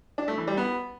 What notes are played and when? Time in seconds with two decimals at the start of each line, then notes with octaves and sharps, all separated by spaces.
0.18 D4
0.28 A3
0.38 E3
0.48 G3
0.57 B3